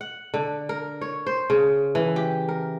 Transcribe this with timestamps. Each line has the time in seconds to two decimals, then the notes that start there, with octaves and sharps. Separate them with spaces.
0.01 F#5
0.34 D3
0.69 A#4
1.01 C#5
1.27 C5
1.50 C#3
1.95 E3
2.16 G4
2.49 A#4